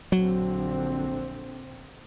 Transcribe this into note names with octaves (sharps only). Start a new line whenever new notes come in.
A#1 D3 F#3 C4